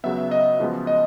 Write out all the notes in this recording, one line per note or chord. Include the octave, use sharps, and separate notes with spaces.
C#2 C#3 F#3 B3 E5
D#5
F#2 C#3 F3 G#3 B3
D#5